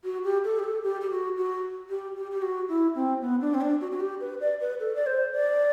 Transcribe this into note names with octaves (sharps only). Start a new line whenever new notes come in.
F#4
G4
A4
G4
A4
G4
G4
F#4
F#4
G4
G4
G4
F#4
E4
C4
B3
D4
C4
D4
F#4
F#4
G4
B4
D5
B4
A4
D5
C5
D5